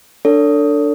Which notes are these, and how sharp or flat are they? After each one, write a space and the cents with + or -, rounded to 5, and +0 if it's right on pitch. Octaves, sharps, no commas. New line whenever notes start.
D4 +0 A4 +30 C#5 +40